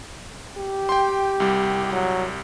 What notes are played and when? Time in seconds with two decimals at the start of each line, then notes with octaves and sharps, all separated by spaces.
0.57 G4
0.89 G5 C6
1.40 C2 G3
1.92 F#3